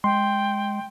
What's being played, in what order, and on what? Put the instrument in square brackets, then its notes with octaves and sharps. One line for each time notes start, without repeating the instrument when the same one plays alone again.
[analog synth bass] G#3 [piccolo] G5 [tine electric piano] C6